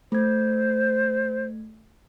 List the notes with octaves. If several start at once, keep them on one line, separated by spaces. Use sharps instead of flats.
A3 C5 G#6